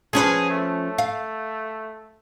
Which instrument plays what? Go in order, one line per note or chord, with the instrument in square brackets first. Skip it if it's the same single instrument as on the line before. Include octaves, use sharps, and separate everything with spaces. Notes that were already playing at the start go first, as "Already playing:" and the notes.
[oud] F3 C#4 B4 [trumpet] G#4
[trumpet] A3
[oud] F5